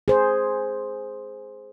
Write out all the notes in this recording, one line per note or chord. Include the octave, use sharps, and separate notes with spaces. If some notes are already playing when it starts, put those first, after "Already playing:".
G#4 C5